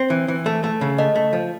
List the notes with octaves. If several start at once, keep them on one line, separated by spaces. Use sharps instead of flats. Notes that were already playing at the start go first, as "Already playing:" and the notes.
Already playing: C4
E3
E3
A3
A3
C#3
A3 D#5
A3
F3